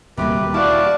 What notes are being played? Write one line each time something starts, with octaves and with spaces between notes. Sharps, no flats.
D#1 D2 C3 G3 A#3 G4 B4
E4 F#4 D5 F5 A5 D6